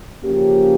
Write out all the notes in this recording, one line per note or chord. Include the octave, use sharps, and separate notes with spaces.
C#3 F3 A#3 C#4 G4